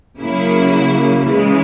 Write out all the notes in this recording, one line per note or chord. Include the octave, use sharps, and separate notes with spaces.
C#3 F#3 A#3 E4
C#3 E3 G#3